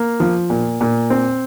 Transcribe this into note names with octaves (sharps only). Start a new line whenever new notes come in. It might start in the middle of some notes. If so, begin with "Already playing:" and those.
Already playing: A#3
F3
A#2
A#2
C4